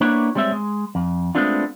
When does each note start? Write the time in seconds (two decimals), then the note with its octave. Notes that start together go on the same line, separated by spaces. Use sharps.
0.01 A#3 B3 D4 E4 C#5
0.35 G3 G#3 C4 C#5 E5
0.52 G#3
0.95 F2
1.35 G#3 A3 B3 C4 D4 F4